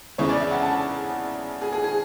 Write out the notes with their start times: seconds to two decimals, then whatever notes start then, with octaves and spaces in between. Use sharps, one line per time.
0.18 E2 C#3 E3 C#5
0.29 D5
0.40 E5
0.51 F#5
0.63 A5
1.62 G#4
1.73 G#4
1.84 G#4